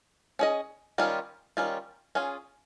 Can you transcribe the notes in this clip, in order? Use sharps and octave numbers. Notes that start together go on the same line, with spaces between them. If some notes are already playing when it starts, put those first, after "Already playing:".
C#4 G#4 D#5
D#3 G3 C#4 F4
D#3 G3 C#4 F4
C#4 F4 G#4